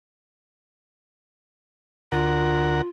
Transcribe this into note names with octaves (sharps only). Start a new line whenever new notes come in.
D2 F4 A#4 F#5